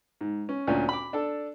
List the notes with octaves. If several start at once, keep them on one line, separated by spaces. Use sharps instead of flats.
G#2
C#4
D2 A#2 C#4 D4
B5 D6
D4 A4